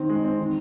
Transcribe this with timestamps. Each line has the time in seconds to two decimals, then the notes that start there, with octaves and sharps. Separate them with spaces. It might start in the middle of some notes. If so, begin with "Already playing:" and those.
Already playing: D#3 C4
0.09 G#3
0.24 C4
0.39 D#3